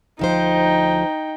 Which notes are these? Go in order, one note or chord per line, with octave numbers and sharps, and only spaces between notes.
D2 F3 D#4 C5 G5